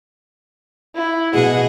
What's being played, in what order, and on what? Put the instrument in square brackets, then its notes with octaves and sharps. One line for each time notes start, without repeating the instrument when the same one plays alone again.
[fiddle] E4
[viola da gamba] B2 G#4 D#5 [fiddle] F#5